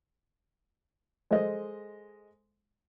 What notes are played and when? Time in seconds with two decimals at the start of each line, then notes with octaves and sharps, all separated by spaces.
1.31 G#3 A4 C5 D#5